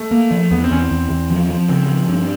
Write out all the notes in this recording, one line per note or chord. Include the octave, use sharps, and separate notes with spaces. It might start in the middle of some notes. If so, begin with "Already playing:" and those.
Already playing: A3
A#3
F3
E2 B3
C4
E2 C#4
C4
E2
E2
F3
F3
C#3 C4
F3
G2 C4